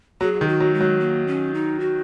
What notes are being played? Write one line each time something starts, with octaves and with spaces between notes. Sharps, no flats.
F#3 G#4
D#3
F#4
F#3
G#3
F#3
A#3
C#4
D#4
F#4